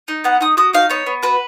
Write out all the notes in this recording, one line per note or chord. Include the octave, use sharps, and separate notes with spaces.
D#4
B3 F#5
D#4 D#6
F#4 D#6
D#4 F5
B3 C#5
B3
F#4 B4